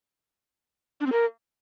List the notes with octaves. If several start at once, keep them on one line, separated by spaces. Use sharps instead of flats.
D4
C4
A#4